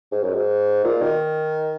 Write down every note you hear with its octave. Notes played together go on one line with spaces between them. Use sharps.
G#2
F#2
G#2
A#2
D#3